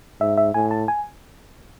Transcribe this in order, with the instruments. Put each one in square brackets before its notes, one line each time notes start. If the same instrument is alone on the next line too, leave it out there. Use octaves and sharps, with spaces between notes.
[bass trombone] G#2 [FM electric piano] E5
[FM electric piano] E5
[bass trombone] A2 [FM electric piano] G#5
[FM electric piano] A5
G#5